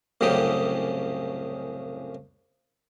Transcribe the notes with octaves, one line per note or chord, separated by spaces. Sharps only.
C2 F#2 A2 C#3 G4 D#6